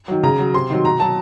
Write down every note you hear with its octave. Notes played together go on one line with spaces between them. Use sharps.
D#3 F#3
C#3 A#5
F#3
C3 C6
D#3 F#3
B2 A#5
F#3 A5